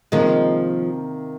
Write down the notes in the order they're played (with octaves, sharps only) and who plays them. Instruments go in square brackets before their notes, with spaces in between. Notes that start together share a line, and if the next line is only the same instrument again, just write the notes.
[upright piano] C3 D#3 A#3 [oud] F3 G#3